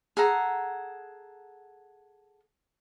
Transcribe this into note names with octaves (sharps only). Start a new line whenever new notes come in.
G#4 A4 F#5 A#5